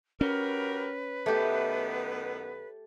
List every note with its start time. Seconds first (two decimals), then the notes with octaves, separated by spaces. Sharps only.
0.21 G3 C#4 F#4 A#4 B4
1.26 F#2 D#3 A3 B3 G4